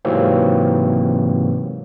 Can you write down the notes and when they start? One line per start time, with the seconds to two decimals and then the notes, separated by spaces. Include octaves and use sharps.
0.05 G#2 C3 E3 F#3 A#3 C4